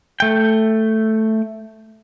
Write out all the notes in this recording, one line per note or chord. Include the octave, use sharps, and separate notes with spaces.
A3 G5